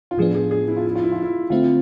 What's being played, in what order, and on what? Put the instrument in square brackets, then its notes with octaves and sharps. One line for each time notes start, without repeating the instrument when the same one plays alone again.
[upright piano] F4
[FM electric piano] A2 F3 B3 D4 [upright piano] G#4
[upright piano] G#4
G#4
E4
F4
E4
F4
E4
F4
E4
[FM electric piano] D3 A3 C4 E4 [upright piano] F4